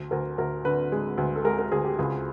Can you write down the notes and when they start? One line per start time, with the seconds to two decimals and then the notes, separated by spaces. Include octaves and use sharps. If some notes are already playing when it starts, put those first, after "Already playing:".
Already playing: D2
0.11 D2 A#4
0.38 D2 A#4
0.65 D3 B4
0.92 G#3
1.18 D2
1.36 A4
1.45 G#3 A#4
1.58 A#4
1.71 D2 G#4
1.85 G4
1.99 C#2 G#4